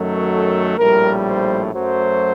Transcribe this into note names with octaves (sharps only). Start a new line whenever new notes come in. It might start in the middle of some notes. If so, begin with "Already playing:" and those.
Already playing: F#2 D#3 F#3 A3
A4
A#1 A2 G3 A#4
C5
F#2 F#3 A3 C5